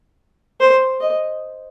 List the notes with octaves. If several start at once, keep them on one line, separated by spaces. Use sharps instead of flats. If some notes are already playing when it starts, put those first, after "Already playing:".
C5
D#5